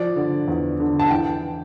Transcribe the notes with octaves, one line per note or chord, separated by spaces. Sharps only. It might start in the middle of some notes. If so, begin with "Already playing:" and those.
Already playing: F3 D5
D3
E2
D3
A5
E3 G5